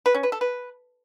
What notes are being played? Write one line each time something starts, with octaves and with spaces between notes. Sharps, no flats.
B4
C#4
B4
A4
B4